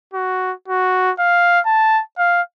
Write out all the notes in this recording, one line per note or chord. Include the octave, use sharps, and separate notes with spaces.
F#4
F#4
F5
A5
F5